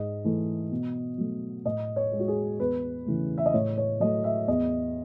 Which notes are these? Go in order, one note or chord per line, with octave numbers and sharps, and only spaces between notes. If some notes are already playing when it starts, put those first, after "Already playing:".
Already playing: G#2 D#5
E3 A3
B2
F#3 A3
A2 D#5
C#5
G#3
F#4
G#4
E2 B4
C#3 E3 A3
E5
D#5
A2 C#5
C#5
F#3 A3 D#5
E5
E2 D#5